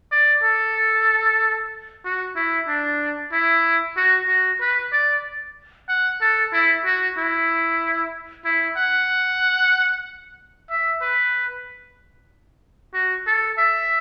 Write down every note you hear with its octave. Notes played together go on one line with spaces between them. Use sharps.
D5
A4
F#4
E4
D4
E4
F#4
F#4
B4
D5
F#5
A4
E4
F#4
E4
E4
F#5
E5
B4
F#4
A4
E5